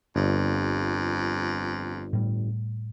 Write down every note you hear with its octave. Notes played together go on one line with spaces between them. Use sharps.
G1 F2
A2 G3